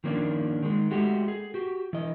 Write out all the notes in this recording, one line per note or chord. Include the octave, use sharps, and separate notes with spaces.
D#3 F3 A#3 C#4 D4
D#3 G#3
G#3 A3 F#4 G4
G#4
F#4 G4
E3 D#5